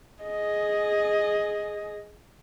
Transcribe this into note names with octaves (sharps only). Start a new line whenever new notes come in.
G#4 D#5